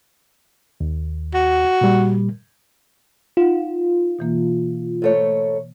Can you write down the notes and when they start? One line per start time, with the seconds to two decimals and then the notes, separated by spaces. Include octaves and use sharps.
0.80 D#2
1.34 F#4
1.81 A#2 G3
3.37 D#4 F4 F#5
4.19 B2 E3 A#3
5.02 G#2 A3 C#5